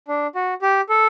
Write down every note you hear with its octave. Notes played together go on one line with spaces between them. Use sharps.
D4
F#4
G4
A4